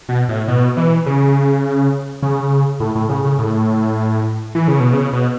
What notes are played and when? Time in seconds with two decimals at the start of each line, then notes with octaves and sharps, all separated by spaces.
0.09 B2
0.28 A2
0.48 B2
0.77 E3
1.06 C#3
2.22 C#3
2.80 A2
2.95 A2
3.09 C#3
3.24 C#3
3.39 A2
4.55 E3
4.68 C#3
4.80 B2
4.93 C#3
5.13 B2